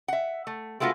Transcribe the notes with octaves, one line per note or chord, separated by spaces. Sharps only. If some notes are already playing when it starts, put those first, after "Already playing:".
E5 F#5
A3
G#3 A3 B3 F4 F#4